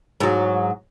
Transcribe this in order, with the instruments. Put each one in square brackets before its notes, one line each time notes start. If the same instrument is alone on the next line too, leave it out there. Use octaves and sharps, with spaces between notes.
[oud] G#2 F#3